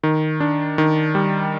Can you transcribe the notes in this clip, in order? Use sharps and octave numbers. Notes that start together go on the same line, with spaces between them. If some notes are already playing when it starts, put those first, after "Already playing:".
D#3
D4
D#3
G3